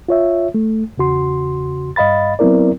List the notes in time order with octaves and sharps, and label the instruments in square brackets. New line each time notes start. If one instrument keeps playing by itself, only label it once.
[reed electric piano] F4 C#5 E5
A3
E2 C#3 F#4 C6
G2 D#5 F5 B5 A6
F#3 B3 C4 E4 A#4 D5